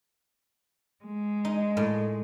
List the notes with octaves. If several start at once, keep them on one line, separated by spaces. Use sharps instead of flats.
G#3
D#4
A2